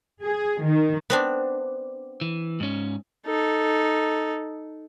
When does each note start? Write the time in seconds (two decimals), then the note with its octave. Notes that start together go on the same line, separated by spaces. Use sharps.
0.23 G#4
0.63 D#3
1.10 B3 C4 D4
2.21 E3
2.60 G#2 C#4
3.26 D#4 A4